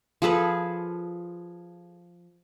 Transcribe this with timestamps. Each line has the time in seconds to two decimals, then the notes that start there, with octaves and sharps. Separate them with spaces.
0.22 F3 G#4 A4 B4